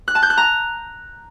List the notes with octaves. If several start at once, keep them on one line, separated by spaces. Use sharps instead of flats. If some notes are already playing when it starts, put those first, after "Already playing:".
F#6
A5
G6
F#6
A#5